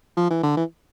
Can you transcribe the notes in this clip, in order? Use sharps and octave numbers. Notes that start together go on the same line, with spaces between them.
F3
E3
D3
E3